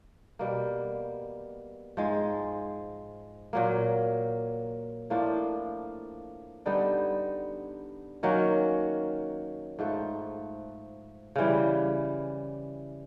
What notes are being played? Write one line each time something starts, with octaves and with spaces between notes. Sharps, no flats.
B2 G3 A#3
G#2 F3 G#3
A#2 F#3 A#3
A2 F3 A#3 D4
D3 G3 B3 D#4
D#3 F#3 A#3 C#4
G#2 F3 A3
C#3 E3 G3